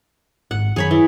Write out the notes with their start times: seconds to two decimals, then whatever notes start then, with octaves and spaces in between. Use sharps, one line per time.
0.51 G#1 G#2 F#5
0.76 F#2 D#3 F#3 G#4 C#5 B5
0.91 E3